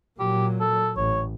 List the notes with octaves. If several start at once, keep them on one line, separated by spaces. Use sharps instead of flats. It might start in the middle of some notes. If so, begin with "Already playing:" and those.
A#2 F#3 G4
A4
A1 C#5